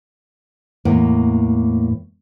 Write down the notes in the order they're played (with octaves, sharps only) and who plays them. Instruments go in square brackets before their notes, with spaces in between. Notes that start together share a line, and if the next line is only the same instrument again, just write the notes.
[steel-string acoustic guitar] E2 A2 A#3